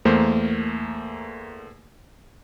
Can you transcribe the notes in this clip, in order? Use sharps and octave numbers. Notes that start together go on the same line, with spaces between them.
E2 A3 A#3 A#4 C5